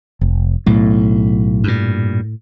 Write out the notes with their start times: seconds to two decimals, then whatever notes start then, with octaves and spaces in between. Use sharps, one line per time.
0.21 F1
0.66 B1 A2
1.64 G2 A#2